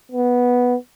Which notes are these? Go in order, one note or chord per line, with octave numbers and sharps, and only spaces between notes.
B3